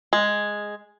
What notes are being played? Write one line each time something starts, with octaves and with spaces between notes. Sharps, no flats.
G#3